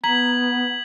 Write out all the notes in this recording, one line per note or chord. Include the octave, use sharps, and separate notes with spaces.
B3 A#5 G#6 B6 F#7